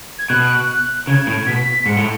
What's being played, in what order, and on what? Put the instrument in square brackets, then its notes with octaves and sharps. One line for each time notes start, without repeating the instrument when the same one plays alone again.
[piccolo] G#6
[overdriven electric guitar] B2 [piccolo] F#6
[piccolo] F#6
[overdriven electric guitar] C#3 [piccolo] G#6
[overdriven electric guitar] A2
[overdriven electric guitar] B2 [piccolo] B6
[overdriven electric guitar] G#2 [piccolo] C#7
[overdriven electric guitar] A2